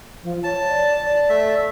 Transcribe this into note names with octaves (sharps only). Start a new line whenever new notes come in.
F3
C#5 A5
D5
D5
A3 E5